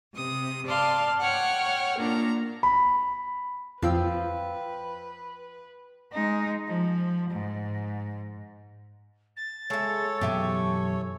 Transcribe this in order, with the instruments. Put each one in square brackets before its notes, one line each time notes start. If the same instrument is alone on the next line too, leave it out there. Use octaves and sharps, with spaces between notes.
[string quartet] C3 D#6
D5 F5 A5 C6
C#5 F#5 G5 F6
A#2 D4 A#5
[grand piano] B5
[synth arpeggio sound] F2 [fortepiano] F3 [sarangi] B4 [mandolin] F5 G5 E6
[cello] G#3 D#4
F3
G#2
[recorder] A6
[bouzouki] G#3 E5 [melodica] A4 C#5
[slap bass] F#2 B2 E3 [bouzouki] G4 E5 G#5 [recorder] C#6